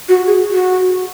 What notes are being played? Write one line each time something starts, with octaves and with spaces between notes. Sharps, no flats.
F#4
G#4
F#4